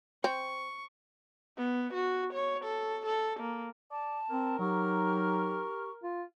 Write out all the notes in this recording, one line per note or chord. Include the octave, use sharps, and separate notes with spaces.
C4 C#6
B3
F#4
C#5
A4
A4
A#3
D5 A5
C4 A#4
F#3 D#4 G4 C#6 F6
F4